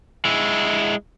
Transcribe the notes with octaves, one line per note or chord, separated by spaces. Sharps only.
G#3 E4